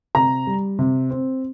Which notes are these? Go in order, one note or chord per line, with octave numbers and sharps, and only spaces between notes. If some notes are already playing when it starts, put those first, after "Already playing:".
C3 A#5
G3
C3
C4